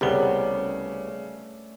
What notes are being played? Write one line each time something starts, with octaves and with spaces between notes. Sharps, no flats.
C2 C#3 G3 A3 B3 C#4 D4 G7